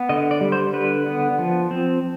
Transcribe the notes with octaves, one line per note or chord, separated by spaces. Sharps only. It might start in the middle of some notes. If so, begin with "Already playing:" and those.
Already playing: B3
D3 D#5
D5
G3
C5
D3 B4
B3
F3
C4